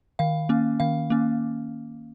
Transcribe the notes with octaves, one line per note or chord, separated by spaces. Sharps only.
D#3 F5
A#3 C#4
D#3 F5
A#3 C#4